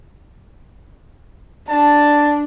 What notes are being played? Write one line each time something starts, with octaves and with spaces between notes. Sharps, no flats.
D4 A5